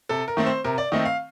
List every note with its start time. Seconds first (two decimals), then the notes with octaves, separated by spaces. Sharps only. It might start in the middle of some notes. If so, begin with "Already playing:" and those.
0.09 C3 A4
0.28 A#4
0.37 D#3 A3 C4
0.46 C5
0.64 C3 A#4
0.78 D5
0.92 D#3 A3 C4 D#5
1.05 F5